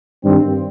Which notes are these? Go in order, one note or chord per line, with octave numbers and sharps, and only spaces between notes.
G2 D#3 G3 C4